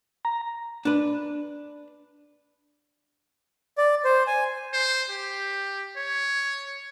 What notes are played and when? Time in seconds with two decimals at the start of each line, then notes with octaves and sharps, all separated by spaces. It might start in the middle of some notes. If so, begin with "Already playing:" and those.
0.25 A#5
0.85 D4 B4
3.78 D5
4.05 C5
4.27 G#5
4.73 C5
5.10 G4
5.97 C#5